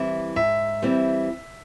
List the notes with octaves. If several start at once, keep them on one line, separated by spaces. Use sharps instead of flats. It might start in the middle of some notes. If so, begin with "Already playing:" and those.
Already playing: E3 G3 C4 E4
G#2 E5
E3 G3 C4 E4